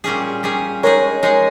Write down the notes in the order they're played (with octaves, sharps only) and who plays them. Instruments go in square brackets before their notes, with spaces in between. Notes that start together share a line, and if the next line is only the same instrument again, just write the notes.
[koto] A#2 G3 C#4 G#4
A#2 G3 C#4 G#4
[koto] G#3 D#4 G#4 [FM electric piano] A#4 C#5
[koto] G#3 D#4 G#4